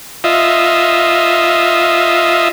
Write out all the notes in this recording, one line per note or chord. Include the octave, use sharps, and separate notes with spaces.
F4 D#5 E5